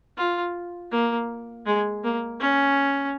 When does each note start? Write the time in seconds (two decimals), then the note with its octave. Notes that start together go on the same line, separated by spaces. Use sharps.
0.18 F4
0.92 A#3
1.66 G#3
2.04 A#3
2.40 C#4